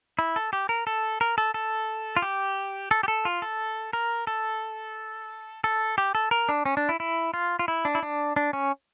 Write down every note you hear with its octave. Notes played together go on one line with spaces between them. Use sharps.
E4
A4
G4
A#4
A4
A#4
A4
A4
F4
G4
A4
G4
A4
F4
A4
A#4
A4
A4
G4
A4
A#4
D4
C#4
D4
E4
E4
F4
F4
E4
D4
E4
D4
D4
C#4